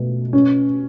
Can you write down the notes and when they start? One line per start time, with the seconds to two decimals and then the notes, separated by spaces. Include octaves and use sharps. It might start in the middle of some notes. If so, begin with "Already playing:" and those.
Already playing: B2 A3
0.33 C#4